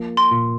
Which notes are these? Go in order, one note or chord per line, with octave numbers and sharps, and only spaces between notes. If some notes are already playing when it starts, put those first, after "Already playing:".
Already playing: F3 A#3
C6
A#2